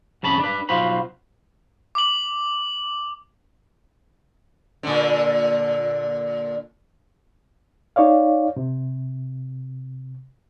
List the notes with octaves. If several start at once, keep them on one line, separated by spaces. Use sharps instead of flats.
F2 C#3 A5 B5
D4 B4
B1 F4 F#4 C5 B5
D6 F#7
A#2 D3
D#4 C#5 D5 F5
C3